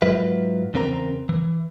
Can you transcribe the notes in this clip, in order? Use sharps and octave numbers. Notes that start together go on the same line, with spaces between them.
G#2 F#3 F4 B4 E5
E2 C#3 C4 A#4 B4 A#5
E3